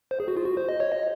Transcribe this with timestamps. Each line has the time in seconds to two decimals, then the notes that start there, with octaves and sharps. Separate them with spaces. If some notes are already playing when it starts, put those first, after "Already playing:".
0.11 C5
0.20 G#4
0.28 F#4
0.37 F4
0.45 F#4
0.57 C5
0.69 D#5
0.80 C#5
0.92 D#5